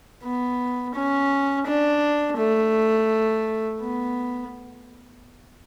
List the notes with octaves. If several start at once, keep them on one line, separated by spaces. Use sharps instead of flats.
B3
C#4
D4
A3
B3